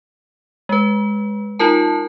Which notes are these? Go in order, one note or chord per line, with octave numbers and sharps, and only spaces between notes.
G#3 B4
D#4 F4 A#4 A5